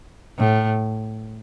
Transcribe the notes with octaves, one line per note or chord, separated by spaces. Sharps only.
A2